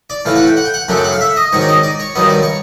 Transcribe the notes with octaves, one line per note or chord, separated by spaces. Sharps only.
D5
A2 E3 A3 F5
F#5
G5
F#5
G5
F#5
F#2 C#3 F#3 A3 D4
G5
F#5
F5
E5
D#5
G#2 D#3 F#3 C#5
D5
D#5
D5
C#5
G2 D#3 F#3 B3 D#5
D5
C#5